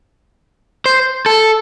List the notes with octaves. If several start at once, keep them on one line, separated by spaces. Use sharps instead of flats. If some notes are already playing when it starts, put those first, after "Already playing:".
C5
A4